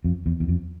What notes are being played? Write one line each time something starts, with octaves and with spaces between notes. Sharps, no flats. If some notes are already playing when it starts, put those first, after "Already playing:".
F2
E2
E2
F2